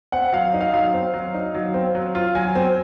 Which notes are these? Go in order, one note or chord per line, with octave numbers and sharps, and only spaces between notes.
C4 F#5
F#3 F5
D#4
F5
F#3 F5
C4
F#3
D#4
F#3
C4
F#3
F4
F#3 G#5
C4